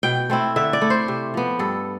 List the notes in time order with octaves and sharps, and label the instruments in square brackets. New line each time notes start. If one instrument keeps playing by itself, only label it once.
[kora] B2 G5
A3 C4 E4
D3 E5
D5
A3 E4
C5
C3
F3 B3
G2 A4